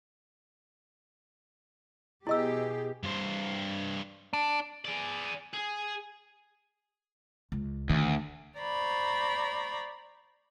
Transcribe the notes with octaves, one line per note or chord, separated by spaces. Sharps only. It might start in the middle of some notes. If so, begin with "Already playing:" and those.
B2 E4 G4 G#4 D#5 E6
G2 C5
D4
G#4 D5
G#4
C#2
D2 D#3
C5 D5 A#5 B5 C#6